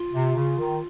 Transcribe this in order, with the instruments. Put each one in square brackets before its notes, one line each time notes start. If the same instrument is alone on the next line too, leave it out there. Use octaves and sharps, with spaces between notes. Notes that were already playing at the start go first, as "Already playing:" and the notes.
Already playing: [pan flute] F4
[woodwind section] C3
C#3
D#3